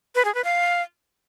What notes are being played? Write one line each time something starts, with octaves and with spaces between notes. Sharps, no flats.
B4
G#4
B4
F5